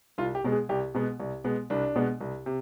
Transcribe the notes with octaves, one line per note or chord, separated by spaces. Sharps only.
C2 F4
G4
B2 G#3 B3
G#4
C2 G4
B2 G#3 B3
C2
B2 G#3 B3
C2 D4
B2 G#3 B3
C2
C3